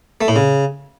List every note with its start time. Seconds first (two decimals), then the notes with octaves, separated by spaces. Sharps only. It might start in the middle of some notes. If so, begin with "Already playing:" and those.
0.21 A3
0.28 A2
0.36 C#3